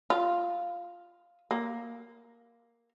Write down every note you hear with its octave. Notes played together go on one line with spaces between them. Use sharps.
F4
A#3